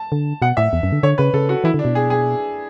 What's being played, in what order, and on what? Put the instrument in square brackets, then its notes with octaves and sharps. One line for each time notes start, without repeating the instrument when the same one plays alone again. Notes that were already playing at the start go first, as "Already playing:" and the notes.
Already playing: [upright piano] A5
[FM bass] D3
[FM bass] B2 [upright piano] F#5
[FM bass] A2 [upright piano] E5
[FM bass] E2
F#2
D3
[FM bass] D3 [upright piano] C#5
[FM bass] C#3 [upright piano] B4
[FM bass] C#3 [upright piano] A4
[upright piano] F#4
[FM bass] E3 [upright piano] E4
[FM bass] D3
[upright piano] D4
[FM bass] B2
[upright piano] G#4
G#4